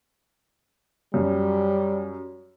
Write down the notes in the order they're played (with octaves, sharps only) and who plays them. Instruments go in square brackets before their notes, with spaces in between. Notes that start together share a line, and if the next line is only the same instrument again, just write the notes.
[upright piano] F#2 [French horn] G3